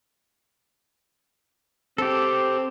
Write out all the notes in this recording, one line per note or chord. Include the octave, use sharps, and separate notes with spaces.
C4 G4 A4